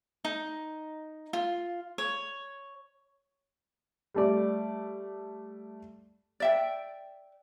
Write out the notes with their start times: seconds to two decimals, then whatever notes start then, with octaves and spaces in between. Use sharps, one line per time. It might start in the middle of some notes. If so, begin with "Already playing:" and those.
0.25 D#4
1.33 F4
1.98 C#5
4.14 G3 A3 D5
6.40 D5 E5 G5